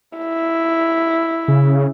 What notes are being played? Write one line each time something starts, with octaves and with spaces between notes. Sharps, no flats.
E4
C#3